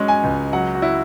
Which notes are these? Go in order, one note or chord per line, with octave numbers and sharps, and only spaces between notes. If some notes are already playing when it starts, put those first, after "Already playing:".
Already playing: F#3 G#3 C#4
G#5
C#2
F#3 F#5
F#4
E4